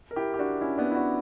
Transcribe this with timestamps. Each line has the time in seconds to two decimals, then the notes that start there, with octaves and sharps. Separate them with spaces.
0.11 A#4
0.16 E4 G4
0.34 G4
0.39 D4 F#4
0.61 C#4 E4
0.78 B3 D4
0.91 E4
0.95 D4 F#4